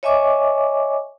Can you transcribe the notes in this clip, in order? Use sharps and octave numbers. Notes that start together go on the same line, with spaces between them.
C#5 D#5 E5 G#5 C#6 D6